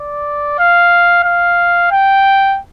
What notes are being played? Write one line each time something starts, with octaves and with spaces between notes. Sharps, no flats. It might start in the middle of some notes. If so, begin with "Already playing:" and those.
Already playing: D5
F5
F5
G5